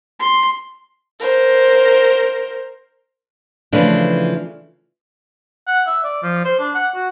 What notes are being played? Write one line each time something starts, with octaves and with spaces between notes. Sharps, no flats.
C6
A#4 C5
C#3 E3 F3 A3 D4
F#5
E5
D5
F3
C5
D4
F#5
F#4